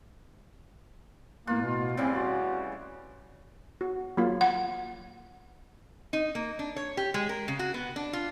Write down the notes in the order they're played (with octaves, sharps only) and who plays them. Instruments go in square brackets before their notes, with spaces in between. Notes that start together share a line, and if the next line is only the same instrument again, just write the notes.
[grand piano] A2 B3 F#6 [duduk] A#3 [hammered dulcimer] F4
[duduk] B2
[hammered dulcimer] C#3 E3 G3 [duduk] C4 [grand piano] D5
[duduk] F#4 [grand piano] C6 A6
[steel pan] F#4
F#3 A#3 F4
[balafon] F#5
[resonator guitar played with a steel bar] D#4
A#3
D4
C#5
G4
G#3
A#4
C#3
F#4
B3
D4
F4